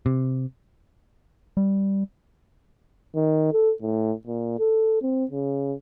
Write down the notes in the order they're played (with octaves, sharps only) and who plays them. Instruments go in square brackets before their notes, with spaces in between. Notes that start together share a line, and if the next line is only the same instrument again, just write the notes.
[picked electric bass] C3
[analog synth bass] G3
[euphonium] D#3
A4
A2
A#2
A4
C4
C#3